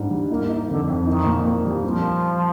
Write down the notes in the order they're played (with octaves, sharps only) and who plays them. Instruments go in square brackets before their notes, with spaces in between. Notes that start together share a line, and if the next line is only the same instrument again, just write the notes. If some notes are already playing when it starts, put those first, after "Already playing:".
Already playing: [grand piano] G#2 G3 D4
G3
[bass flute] A#3 [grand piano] D#4
[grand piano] D#4
[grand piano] F2 [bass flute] D3
[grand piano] F2
[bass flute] D#3 [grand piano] D#4
[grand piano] A#2
A#3
G3
[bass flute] F3 [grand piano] C4